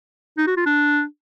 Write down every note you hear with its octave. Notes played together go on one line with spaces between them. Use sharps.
D#4
F#4
F4
D4